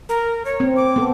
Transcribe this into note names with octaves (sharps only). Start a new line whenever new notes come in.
A#4
C#5
C4
D6
B3 A4